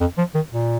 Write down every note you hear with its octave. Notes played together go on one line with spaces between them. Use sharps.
F2
F3
D#3
A#2